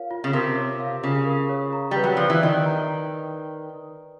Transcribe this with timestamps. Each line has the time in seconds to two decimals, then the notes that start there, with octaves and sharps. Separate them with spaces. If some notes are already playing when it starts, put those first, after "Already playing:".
Already playing: F4 A#4 C#5 F5
0.11 F4
0.24 C#3
0.33 C3 A#4
0.56 C#5
0.80 F5
1.03 C#3 F4
1.26 A#4
1.49 C#5
1.73 A#5
1.91 G3 B4
2.04 F#3
2.17 F3 D5
2.30 E3
2.43 D#3 G5
2.66 A#5